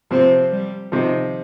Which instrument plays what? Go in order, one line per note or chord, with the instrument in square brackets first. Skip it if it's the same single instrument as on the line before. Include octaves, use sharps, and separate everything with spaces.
[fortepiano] C3 F3 [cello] C4
[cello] G3
[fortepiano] C3 F3 [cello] D#3